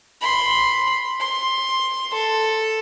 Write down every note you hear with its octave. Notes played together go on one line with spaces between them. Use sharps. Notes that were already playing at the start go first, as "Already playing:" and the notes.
B5 C6
C6
A4